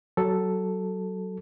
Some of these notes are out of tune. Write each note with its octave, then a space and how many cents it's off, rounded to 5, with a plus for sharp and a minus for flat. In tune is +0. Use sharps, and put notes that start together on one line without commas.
F#3 +20 A4 +0